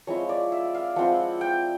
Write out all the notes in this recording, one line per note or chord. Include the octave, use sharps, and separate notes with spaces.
F3 G#3 C4 E4 C#5
D5
E5
F5
F3 G#3 C4 E4 F#5
G5